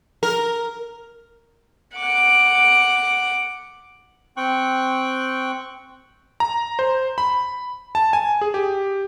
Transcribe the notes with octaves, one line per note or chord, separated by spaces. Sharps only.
A#4
F#5 D6
C4 G5 C#6 F#6
A#5
C5
B5
A5
G#5
G#4
G4